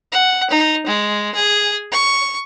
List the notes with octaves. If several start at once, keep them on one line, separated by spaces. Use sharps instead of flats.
F#5
D#4
G#3
G#4
C#6